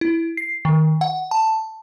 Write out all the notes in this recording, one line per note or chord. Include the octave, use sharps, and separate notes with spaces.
E4
C7
D#3
F#5
A5